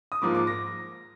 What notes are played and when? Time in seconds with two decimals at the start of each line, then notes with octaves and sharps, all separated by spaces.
0.12 D#6
0.22 G#2 F3 A#3 D6
0.35 D6
0.47 A#6